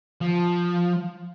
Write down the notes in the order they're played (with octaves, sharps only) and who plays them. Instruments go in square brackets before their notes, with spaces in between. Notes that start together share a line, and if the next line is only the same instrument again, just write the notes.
[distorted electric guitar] F3